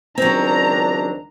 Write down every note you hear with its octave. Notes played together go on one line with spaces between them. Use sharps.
C#2 D#3 F#3 C4 D4 A#5